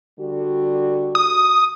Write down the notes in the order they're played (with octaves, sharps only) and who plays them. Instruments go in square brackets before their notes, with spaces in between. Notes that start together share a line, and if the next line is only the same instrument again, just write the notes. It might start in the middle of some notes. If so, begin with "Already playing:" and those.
[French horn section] D3 G3 F#4
[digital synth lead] D#6